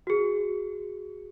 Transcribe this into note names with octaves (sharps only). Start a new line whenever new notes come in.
F#4 G#4